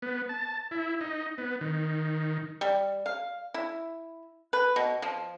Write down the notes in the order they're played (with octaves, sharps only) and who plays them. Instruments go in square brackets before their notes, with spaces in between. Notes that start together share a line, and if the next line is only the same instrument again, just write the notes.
[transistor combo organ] B3
A5
E4
D#4
B3
D#3
[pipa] G3
F5
E4
B4
B2
F3